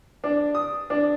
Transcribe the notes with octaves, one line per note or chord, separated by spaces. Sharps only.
D4
D#6
D4